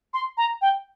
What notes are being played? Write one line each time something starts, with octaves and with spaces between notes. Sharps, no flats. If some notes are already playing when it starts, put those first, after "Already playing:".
C6
A#5
G5